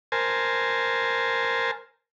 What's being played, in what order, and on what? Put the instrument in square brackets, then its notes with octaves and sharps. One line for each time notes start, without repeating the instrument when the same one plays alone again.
[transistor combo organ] A#4 C5 G#5 A5